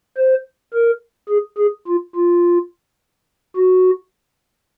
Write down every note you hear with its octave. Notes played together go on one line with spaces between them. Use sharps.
C5
A#4
G#4
G#4
F4
F4
F#4